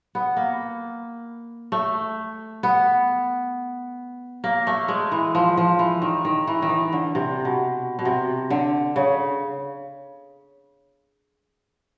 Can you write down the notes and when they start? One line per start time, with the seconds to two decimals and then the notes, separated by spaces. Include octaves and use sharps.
0.15 B3
0.37 A#3
1.72 A3
2.63 B3
4.44 A#3
4.67 A3
4.88 G#3
5.12 E3
5.35 F3
5.57 F3
5.79 E3
6.02 D#3
6.25 D#3
6.47 E3
6.62 D#3
6.69 E3
6.93 D3
7.15 C3
7.45 B2
7.99 B2
8.05 C3
8.50 D3
8.96 C#3